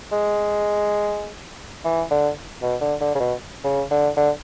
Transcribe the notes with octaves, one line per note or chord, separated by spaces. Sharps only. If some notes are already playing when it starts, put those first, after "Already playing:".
G#3
E3
D3
B2
D3
D3
C#3
B2
C#3
D3
D3